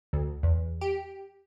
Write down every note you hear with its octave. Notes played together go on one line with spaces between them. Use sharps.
D2
E2
G4